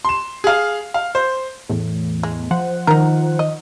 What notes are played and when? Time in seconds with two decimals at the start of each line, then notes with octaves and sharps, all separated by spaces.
0.05 C6 E7
0.44 G#4 F5
0.94 F5
1.15 C5
1.69 E2 A2
2.23 G#3
2.51 F3 C5 F#5
2.87 D#3 D#4 A#4
3.39 D#5